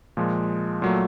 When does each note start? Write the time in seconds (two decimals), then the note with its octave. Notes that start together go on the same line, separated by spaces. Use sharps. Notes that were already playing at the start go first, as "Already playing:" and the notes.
0.17 A#2 F3 G#3
0.82 A#2 F#3 A3